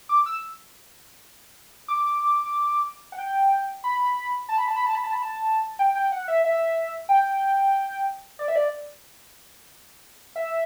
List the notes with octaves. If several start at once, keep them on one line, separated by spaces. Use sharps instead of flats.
D6
E6
D6
F#5
G5
B5
A5
B5
A5
B5
A5
B5
A5
B5
A5
G5
G5
F#5
E5
E5
G5
D5
E5
D5
E5